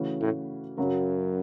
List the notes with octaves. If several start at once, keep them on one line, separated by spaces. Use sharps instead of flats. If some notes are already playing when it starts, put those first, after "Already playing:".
Already playing: C#3 E3 A3 C#4 F#4
A2
F#2 C#3 F#3 C#4 F#4